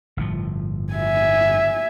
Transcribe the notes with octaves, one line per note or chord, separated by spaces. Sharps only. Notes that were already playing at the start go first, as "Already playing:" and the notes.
G1 A2 F3
E5 G#5